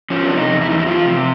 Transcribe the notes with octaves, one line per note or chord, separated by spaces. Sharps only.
F3 C#4
C3 D4
D#4
E2
E4
E2 D#4
E4
F3 F4
C3